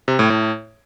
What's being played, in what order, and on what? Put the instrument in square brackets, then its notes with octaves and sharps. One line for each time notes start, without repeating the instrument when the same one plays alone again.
[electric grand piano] C3
A2
A2